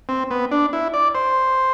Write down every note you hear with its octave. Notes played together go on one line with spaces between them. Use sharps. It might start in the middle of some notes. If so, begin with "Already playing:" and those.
C4
B3
D4
E4
D5
C5